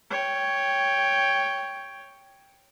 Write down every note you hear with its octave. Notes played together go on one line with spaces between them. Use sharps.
C#5 G5